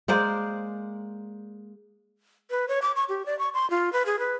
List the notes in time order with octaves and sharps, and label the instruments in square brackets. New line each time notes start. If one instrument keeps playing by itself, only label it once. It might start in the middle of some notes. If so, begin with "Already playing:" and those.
[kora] G#3 A#3 C5 D5
[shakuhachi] B4
C#5
D6
C#6
G4
D5
C#6
C6
F4
B4
G#4
B4